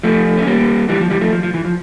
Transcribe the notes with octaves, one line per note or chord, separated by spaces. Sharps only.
F3 A3
C#4
G3 A#3
E3 G3
F3
E3 G3
F3 A3
F3
F3
E3
F3